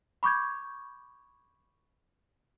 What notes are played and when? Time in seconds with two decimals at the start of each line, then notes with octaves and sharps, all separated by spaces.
0.23 B5 C#6 D6 G6 G#6